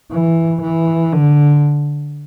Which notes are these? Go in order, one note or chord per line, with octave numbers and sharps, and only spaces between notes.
E3
E3
D3